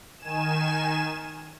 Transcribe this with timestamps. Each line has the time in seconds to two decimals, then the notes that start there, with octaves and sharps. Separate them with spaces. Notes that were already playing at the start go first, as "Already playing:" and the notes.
0.19 D#3 G#5 E7